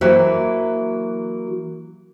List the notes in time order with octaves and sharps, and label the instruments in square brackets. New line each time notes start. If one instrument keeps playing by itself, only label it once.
[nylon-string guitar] E3 F#3 A#3 F#4 C5 E5